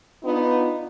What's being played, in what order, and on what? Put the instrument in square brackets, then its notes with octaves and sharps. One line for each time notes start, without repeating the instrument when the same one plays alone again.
[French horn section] B3 D4 D#4 F4